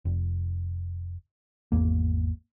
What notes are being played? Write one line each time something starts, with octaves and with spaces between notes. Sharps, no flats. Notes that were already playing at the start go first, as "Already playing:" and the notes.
F1
G#1 E2 A#3